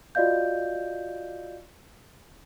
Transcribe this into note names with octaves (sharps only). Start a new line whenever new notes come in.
F4 F#4 D5 D#5 F5 G6